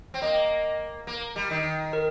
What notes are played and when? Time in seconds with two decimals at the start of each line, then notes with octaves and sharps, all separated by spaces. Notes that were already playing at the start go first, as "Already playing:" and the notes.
0.14 C4
0.22 A#3 D#5
1.07 A#3
1.36 G3
1.50 D#3
1.93 A#4